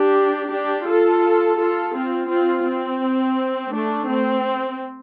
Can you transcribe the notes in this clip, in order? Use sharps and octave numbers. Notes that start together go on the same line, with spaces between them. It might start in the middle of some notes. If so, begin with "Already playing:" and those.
Already playing: D4 G4
D4 G4
F4 A4
F4 A4
C4 F4
C4 F4
C4
A3 D4
C4